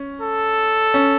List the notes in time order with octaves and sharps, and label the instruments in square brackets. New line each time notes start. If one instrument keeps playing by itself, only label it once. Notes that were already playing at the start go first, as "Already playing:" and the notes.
Already playing: [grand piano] C#4
[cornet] A4
[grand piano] C#4